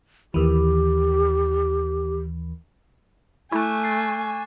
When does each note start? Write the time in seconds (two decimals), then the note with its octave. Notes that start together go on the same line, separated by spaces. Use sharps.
0.34 D#2 E3 G4
3.52 A3 E4 G#5 A5 C#6 D6 F#6
3.84 A6 C7